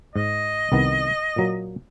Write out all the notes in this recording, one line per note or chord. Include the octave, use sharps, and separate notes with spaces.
G#2 D#5
C2 D#3 B3
A#2 F#3 A#3